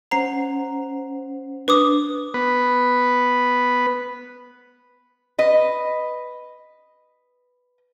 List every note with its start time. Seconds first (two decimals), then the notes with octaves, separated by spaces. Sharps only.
0.11 C#4 C5 F#5 A#5 C7
1.68 D4 B4 D6 D#6
2.34 B3 B4
5.38 B4 D#5